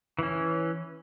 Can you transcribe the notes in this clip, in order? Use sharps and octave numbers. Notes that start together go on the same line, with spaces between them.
E3 C#4